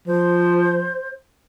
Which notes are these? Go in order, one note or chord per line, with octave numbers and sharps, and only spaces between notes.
F3 C5